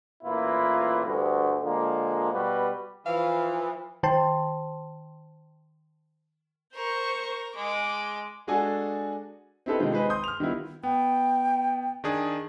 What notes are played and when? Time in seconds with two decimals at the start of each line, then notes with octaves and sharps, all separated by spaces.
0.23 A1 A#2 A#3 E4 F4 B4
1.05 D2 G2
1.62 D3 F3 G#3 A#3
2.32 B2 G3 F#4 B4
3.06 E3 F3 F5
4.03 D#3 C5 G5 A5 C6
6.74 A#4 C5 C#6
7.56 G#3 D6
8.47 G#3 D4 F#4 G#4 A4 G#5
9.66 C4 D#4 E4 G4 A4 B4
9.79 C3 D#3 G#3 F4
9.92 G#3 D#4 G#4 B4 C5
10.10 C6 D#6 G6
10.24 F6 F7
10.40 D#3 G3 B3 E4 F4
10.83 B3 G5
12.04 D#3 D4 G#4